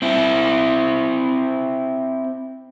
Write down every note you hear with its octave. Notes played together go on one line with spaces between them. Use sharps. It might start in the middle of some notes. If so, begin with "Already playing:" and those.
C4 E4